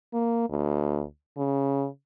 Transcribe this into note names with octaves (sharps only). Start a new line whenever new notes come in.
A#3
D2
C#3